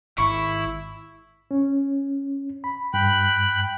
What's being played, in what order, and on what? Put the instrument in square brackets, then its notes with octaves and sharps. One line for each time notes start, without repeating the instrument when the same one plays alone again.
[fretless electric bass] G#1 [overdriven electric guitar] E4 [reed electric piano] C#6
[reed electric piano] C#4
B5
[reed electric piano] G2 [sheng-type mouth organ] G5 B5 F#6